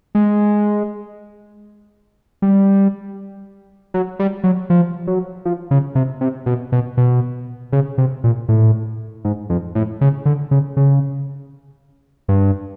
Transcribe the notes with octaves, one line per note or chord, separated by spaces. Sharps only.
G#3
G3
F#3
G3
F#3
F3
F#3
F3
C#3
C3
C3
B2
B2
B2
C#3
C3
A#2
A2
G#2
F2
A2
C#3
D3
C#3
C#3
G2